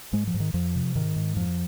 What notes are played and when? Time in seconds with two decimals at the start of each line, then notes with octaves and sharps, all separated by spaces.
0.13 G#2 G#3
0.27 F3
0.34 G#2
0.40 D#3
0.54 F2 F3
0.75 C3
0.95 G#2 D#3
1.16 G#2
1.36 F2 F3